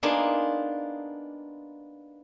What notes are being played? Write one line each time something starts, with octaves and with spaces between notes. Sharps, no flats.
A#3 B3 D4 D#4 F4 G#4